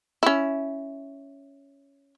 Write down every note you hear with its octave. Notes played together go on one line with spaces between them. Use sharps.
C#4 E4